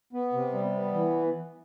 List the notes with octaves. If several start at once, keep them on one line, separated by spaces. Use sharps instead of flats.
B3
C3
G3
B3
E3